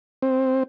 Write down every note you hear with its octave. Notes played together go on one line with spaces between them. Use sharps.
C4